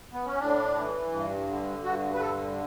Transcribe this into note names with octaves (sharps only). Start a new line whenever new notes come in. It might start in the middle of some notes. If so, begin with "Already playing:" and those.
B3
C#4
A2 D4
E3
G2
D3
G2 F#4
B4
D3 A4